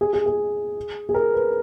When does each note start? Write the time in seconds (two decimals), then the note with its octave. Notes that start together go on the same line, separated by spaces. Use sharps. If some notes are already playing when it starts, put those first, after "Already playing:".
0.01 G#4
0.13 G#4
0.26 G#4
1.09 G#4
1.14 A#4
1.34 B4